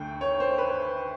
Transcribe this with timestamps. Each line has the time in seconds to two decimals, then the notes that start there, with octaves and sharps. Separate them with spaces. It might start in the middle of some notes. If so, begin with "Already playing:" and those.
Already playing: D2 D3 A3 G5
0.21 C#5
0.40 C5
0.58 B4